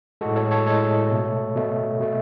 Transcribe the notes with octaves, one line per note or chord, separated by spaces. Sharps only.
A2 G#3 F#4 A4
A4 C#5
A4 C#5
A2 G#3 A4 C#5
B2 A3
B2 A3
B2 A3